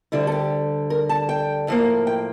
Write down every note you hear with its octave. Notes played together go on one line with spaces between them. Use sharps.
D2 D3 G3 E4
A4
G4
A#4
A5
G5
A2 F3 A#3
G5